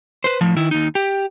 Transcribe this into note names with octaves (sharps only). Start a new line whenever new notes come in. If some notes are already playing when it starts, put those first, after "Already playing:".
B4 C5
A2 F3
D#3 E4
D#2 D#4
G4